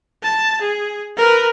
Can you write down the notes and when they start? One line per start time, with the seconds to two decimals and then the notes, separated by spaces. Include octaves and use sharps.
0.23 A5
0.61 G#4
1.17 A#4 B4